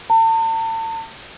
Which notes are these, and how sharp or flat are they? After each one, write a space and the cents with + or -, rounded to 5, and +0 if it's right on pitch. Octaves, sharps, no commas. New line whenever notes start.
A5 +40